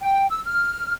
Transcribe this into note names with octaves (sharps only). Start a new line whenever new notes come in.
G5
E6
F6